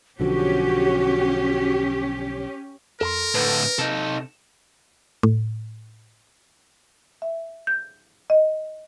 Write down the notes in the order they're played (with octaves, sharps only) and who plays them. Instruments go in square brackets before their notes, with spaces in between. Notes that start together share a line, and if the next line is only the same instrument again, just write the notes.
[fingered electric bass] B1 D3 F3 [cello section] C#4 G4 [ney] F#4
[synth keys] F2 [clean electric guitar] A4 A#5 C6 [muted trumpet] A#4
[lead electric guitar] A2 D3 [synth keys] B4
[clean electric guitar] C3 [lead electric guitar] D#4 A4 [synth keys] E7
[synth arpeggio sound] A2
[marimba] E5
G6
D#5